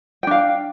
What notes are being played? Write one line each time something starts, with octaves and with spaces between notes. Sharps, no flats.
D4 F5 G5